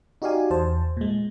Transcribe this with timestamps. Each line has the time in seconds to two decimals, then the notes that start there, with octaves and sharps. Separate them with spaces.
0.22 D#4 F#4 G4 D5 F5 G#5
0.51 E2 C5 A5
0.97 A#2 G#3